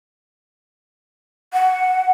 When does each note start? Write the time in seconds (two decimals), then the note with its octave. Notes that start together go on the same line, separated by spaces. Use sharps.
1.53 F#5